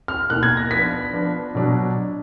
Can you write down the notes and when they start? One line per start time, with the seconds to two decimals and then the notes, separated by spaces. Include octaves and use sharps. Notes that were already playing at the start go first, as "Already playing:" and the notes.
0.08 F6
0.30 B2 A#3 D#4 F#6
0.43 G#6
0.57 A#6
0.71 F3 B3 D4 B6
1.13 F3 B3 D4
1.55 B2 F#3 D4